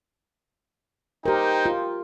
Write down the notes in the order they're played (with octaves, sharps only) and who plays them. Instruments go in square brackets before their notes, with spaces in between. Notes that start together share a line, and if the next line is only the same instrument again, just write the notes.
[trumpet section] D#4 C5 G5 [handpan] G4 A#4
[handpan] F4